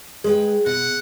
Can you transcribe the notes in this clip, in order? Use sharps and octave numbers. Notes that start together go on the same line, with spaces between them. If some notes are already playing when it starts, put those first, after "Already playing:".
G#3 G#4 B4 G5
B2 F#5